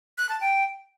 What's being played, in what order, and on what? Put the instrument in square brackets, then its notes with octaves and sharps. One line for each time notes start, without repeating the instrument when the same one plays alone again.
[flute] F#6
A5
G5